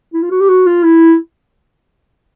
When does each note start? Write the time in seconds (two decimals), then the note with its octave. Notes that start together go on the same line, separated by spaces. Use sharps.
0.13 E4
0.23 F4
0.31 F#4
0.41 G4
0.49 F#4
0.66 F4
0.84 E4